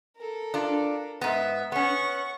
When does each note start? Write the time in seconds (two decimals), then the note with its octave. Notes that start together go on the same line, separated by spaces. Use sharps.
0.17 A4 A#4
0.54 D4 F4
1.21 G#2 B3 E5
1.72 B3 C#4 F#5 C#6